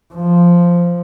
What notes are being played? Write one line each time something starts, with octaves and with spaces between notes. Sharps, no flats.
F3